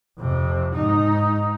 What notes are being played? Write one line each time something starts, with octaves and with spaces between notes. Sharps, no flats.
F2 C3
G#2 D#4